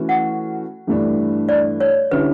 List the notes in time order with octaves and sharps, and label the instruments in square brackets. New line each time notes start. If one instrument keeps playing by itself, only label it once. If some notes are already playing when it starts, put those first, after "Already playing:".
Already playing: [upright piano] E3 A3 C#4 F#4
[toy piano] F#5
[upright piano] G2 E3 A3 D4
[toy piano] D5
C#5
[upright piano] D3 G3 C#4 E4 [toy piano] B4